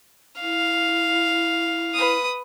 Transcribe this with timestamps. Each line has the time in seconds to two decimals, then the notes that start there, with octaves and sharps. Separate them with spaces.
0.41 E4 F5
1.94 B4 D#6